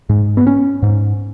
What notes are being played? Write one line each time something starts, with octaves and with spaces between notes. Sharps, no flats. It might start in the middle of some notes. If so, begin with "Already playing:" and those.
G#2
B3
C#4
G#2